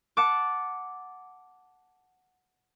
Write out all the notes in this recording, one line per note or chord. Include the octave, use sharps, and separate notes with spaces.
F#5 A5 D6